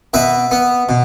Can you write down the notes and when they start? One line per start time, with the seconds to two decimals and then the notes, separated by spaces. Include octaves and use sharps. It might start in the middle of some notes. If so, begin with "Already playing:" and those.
0.14 B2 B4 E5
0.51 B3
0.89 B2